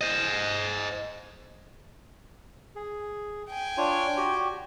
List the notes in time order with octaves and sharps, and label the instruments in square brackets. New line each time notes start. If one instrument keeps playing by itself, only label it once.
[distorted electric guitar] C5 D#5
[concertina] G#4
[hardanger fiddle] G5 G#5
[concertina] D4 F4 C#5
F#4 G4